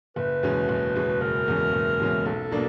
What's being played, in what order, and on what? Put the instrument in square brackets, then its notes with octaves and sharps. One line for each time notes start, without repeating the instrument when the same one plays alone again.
[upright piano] F#1 [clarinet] B4
[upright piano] E2 B2 G#3 C#4
F#1
E2 B2 G#3 C#4
[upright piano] F#1 [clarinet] A#4
[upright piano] E2 B2 G#3 C#4
F#1
E2 B2 G#3 C#4
[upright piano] B1 [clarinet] A4
[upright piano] B2 F#3 A#3 D4